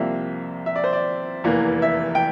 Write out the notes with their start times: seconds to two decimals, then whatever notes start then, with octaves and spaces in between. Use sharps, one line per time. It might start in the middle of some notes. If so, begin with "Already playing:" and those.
Already playing: C2 C3 F3 A#3 E5
0.66 E5
0.76 D5
0.84 C5
0.93 D5
1.44 F1 E2 E3 A#3
1.82 E5
2.15 G5